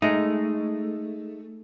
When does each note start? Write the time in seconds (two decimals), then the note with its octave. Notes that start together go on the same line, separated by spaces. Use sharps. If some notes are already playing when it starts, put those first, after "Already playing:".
0.02 G#3 A3 D#4